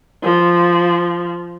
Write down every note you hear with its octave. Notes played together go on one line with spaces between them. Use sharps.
F3